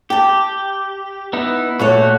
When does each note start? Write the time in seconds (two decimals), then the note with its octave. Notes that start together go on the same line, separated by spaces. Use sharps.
0.10 G4 G5 A5
1.33 B3 D#4 E4
1.79 A#2 A3 F#4 B4 C#5